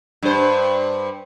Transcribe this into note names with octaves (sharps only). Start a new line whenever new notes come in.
G2 C5